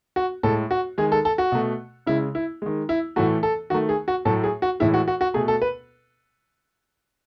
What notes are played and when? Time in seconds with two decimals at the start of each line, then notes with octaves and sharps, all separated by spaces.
0.16 F#4
0.43 A2 G#3 A4
0.71 F#4
0.98 D#3 G#3 G#4
1.12 A4
1.25 A4
1.38 F#4
1.52 B2 A3
2.07 C#3 G#3 E4
2.35 E4
2.62 D#3 G#3
2.89 E4
3.16 A2 E3 A3 F#4
3.43 A4
3.70 D#3 A3 F#4
3.89 G#4
4.08 F#4
4.25 A2 F#3 A3 A4
4.44 G#4
4.62 F#4
4.80 A2 E3 G#3 E4
4.94 F#4
5.08 F#4
5.21 F#4
5.34 B2 A3 G#4
5.48 A4
5.62 B4